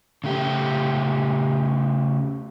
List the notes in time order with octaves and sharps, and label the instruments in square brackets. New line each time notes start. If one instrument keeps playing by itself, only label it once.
[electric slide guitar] C#3 A3 G4